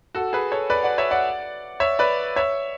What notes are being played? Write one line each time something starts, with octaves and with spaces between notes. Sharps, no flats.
F#4 A4
G#4 B4
A4 C#5
B4 D5
D5 F#5
C#5 E5
D5 F#5
C#5 E5
B4 D5
C#5 E5